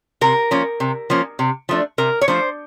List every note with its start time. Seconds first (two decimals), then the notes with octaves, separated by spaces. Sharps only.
0.21 C3 A#4
0.51 F3 A#3 C#4
0.80 C3
1.10 F3 A#3 C#4
1.39 C3
1.69 F3 A3 D4
1.98 C3 A#4
2.21 C#5
2.28 F3 A3 D4 C5